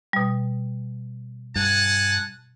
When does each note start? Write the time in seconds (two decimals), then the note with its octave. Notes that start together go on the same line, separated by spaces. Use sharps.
0.13 B2 G3
1.56 G2 F#5 G#5 A5